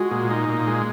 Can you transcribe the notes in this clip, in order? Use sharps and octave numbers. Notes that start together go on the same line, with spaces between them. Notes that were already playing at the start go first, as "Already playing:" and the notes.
Already playing: G#3 F#4
A#2
D#4
A#2
G#3